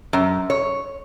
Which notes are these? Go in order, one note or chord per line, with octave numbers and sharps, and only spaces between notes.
F#2
C#5